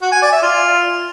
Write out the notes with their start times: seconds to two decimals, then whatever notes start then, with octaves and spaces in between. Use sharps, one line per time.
0.02 F#4
0.12 G#5
0.22 D5
0.32 E5
0.42 F4